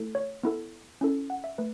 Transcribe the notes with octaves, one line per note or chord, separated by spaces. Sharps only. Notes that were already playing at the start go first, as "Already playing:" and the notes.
Already playing: A3 E4 A4
C#5
B3 E4 A4
C#4 E4 A4
F#5
E5
A3 B4